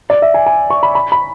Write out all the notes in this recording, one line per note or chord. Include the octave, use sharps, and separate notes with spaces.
D5
E5
G#5
G#5
C#6
B5
B5
B5